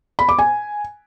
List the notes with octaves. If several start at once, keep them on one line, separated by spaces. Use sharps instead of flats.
B5
D6
G#5